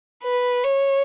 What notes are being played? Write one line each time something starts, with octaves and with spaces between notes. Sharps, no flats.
B4
C#5